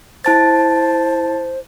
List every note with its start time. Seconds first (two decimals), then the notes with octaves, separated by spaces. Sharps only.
0.25 E4 C5 A5 A6